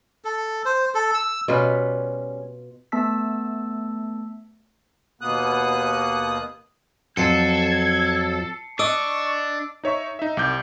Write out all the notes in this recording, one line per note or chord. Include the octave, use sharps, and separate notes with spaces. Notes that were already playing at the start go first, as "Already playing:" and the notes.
A4
C5
A4
E6
B2 G3 C#4 F4 B4
A3 B3 A5 E6 B6
D#2 B2 A#3 B3 D#6 F#6
F2 F#3 A4 A5 G#6 C7 C#7
D4 D#5 C#6 D6 E6
D#4 C#5 E5 C#6
D#4 E5
C2 D6 G6